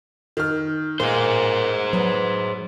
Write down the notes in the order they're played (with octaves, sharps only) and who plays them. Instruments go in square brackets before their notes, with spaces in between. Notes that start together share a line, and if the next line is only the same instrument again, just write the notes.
[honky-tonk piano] D#3 F6
[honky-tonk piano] A#2 A#3 [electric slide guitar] G#4 C5
[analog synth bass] F#3 [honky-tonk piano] B3